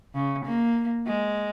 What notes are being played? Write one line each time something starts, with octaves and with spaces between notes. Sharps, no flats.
C#3
A#3
G#3